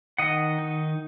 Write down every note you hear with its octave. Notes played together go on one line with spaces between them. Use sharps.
D#3 D#5 F#5
D#4